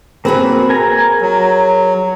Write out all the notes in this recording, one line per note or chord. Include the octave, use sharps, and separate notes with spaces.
A#3 C4 F#4 G#4 B4
A#4 G#5 A#5
F#3